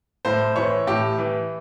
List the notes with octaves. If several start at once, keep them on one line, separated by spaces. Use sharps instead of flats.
A2 C5
E3 C#5
A2 G4
E3